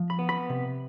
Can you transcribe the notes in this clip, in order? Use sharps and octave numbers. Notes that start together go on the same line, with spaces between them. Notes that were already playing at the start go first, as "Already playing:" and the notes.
Already playing: F3
B5
B3
B5
C3